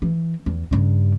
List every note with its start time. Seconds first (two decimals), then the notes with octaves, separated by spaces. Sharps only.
0.02 E3
0.46 E2
0.71 G2 C#3